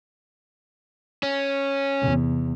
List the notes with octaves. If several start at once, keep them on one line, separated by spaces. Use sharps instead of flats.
C#4
E2 C3